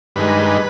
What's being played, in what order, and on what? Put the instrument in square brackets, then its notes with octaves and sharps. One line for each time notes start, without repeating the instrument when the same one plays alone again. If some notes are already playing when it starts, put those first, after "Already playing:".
[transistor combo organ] G2 D#3 G#3 B4